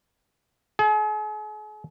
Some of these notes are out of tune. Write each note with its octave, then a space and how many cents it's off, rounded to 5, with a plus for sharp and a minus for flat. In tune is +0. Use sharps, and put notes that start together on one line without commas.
G#4 +40